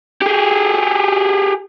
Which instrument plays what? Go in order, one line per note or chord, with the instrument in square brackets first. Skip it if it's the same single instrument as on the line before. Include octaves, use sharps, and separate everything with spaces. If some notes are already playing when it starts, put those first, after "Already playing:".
[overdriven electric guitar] G4 G#4